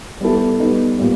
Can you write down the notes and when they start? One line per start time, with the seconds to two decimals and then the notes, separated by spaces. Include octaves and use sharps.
0.21 G3 B3 E4 A4
0.59 G3 B3 D#4
0.97 A#2 G3 B3